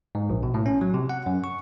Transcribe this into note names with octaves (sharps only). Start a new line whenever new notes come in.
G#2
A#1
B2
A2
C#4
F#3
C3
F#5
F#2
C#6